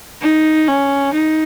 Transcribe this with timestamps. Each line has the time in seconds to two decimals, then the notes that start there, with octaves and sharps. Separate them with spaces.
0.22 D#4
0.67 C#4
1.14 D#4